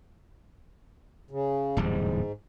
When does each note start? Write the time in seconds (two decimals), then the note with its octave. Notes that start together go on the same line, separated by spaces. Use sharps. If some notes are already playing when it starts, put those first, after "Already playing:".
1.31 C#3
1.77 D1 E2 G#2 G3